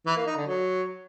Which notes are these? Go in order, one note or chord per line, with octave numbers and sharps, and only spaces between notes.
E3
A#3
D#4
D3
F#3